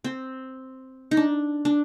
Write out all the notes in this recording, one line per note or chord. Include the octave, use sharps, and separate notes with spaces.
C4
D#4
D4
D4